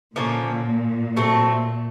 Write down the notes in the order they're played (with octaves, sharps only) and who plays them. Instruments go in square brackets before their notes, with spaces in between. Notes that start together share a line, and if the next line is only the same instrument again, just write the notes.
[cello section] A#2 [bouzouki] D3 F3 A#3 C#4
[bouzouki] F#3 A3 C4